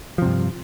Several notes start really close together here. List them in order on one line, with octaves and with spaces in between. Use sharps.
F3 C3 G2